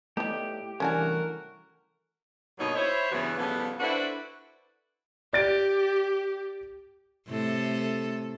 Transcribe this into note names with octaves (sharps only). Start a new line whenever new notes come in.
A2 G3 A3 B3 D#4 G4
C2 E3 A3 C#4 D4 F#4 A#4 G#5
G2 B2 F#3 A#3 D#4 C#5
E4 C5 C#5
G2 C#3 E3 F#3 B3 F#4
A2 C#3 F3 G3 B3
D4 E4 F#4 A4 B4 C5
G4 D5 A6 D7
A2 C3 A4